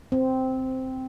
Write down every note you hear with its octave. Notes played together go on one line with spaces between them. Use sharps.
C4